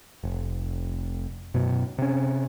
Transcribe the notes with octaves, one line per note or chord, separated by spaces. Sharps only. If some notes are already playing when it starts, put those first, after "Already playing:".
F1
F#2 B2
C3 C#4